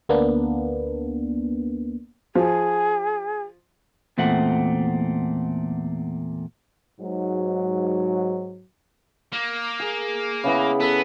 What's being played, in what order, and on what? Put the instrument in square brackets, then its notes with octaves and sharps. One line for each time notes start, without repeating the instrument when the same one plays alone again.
[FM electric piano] D2 A#3 B3 D4
[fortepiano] F3 [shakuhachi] G#4
[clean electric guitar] E2 A#2 A3 C4 F#5
[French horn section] G#2 F#3
[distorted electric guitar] A#3
[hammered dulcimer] G#4
C#3 B3 E4
[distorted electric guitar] B3 [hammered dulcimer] A4 B4